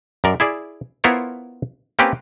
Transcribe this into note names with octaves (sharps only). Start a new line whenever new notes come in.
F#2 A#4 D5
E4 G#4 D5
B3 E4 F4 A#4 C5 C#5
A#3 C4 C#4 G4 B4